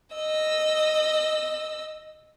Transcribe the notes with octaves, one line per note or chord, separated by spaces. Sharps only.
D#5 E6